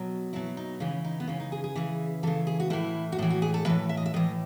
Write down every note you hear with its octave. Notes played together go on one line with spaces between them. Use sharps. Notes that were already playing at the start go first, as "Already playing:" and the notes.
Already playing: B2 F#3
B2 F#3 E4
D#4
C#3 E3 C#4
D#4
B3
C#3 E3 C#4
D#4
G#4
G#4
C#3 E3
C#3 E3 A4
G#4
F#4
A2 E3 E4
F#4
A2 E3 E4
F#4
G#4
A4
A2 E3 B4
E5
D#5
E5
A2 E3 D#5